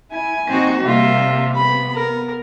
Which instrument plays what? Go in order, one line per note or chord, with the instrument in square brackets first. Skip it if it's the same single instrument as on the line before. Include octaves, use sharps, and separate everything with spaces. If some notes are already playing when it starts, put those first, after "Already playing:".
[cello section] E4 [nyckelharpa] G#5
[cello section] A#2 D#4 [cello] C4 F#4
[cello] C3 [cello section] D#3 G3 A#3 [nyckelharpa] F4 E5
[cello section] B3 [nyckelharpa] B5
[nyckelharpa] A#4